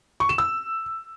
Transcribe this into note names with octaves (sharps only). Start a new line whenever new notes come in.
C#6
E7
E6